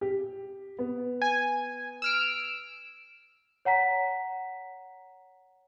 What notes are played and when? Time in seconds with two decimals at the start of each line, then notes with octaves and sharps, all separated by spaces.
0.01 G4
0.78 B3
1.22 G#5
2.02 E6 F6 D7
3.65 C#5 F#5 A#5 B6